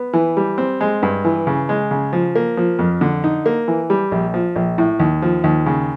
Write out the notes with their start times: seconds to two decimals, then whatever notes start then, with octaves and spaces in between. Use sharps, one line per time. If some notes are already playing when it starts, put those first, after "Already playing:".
Already playing: B3
0.14 E3
0.37 G3
0.58 C4
0.81 G#3
1.03 G2
1.25 E3
1.47 C#3
1.69 G#3
1.91 C#3
2.13 F3
2.35 A#3
2.57 F3
2.79 F2
3.01 D3
3.24 D#4
3.46 A#3
3.68 E3
3.90 G3
4.12 A#1
4.34 F3
4.56 A#1
4.78 A2
5.00 D#2
5.22 F3
5.44 D#2
5.66 C#3